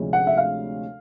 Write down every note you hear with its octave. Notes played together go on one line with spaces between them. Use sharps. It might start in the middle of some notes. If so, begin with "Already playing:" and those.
Already playing: D2 C3 F3 G#3 C#4
F#5
E5
F5